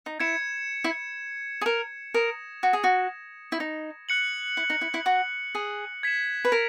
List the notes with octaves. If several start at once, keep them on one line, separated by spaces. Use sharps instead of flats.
D#4
E4 G#6 C#7 E7
E4
G#4
A#4
A#4 D#6 A#6 E7
F#4
G#4
F#4
E4
D#4
F#6 C#7 F#7
E4
D#4
E4
E4
F#4
G#4
G#6 B6 E7
B4
A#4